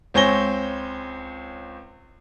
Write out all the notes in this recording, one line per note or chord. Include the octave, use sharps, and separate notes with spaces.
C#2 C4 C#5 G#5 A#6 G7